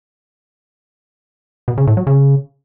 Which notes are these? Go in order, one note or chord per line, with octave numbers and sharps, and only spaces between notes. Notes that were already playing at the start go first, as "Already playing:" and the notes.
B2
C#3
A2
F#3
C#3